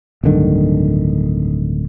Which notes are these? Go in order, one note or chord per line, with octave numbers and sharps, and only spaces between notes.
D1 G2 D3 D#3